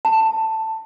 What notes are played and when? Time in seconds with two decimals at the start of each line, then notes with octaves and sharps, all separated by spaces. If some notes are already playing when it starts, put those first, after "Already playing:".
0.05 A5